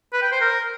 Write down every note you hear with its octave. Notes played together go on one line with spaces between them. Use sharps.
B4
G5
C5
A#4